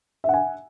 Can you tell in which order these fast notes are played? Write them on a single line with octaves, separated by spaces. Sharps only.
E5 F#5 G#5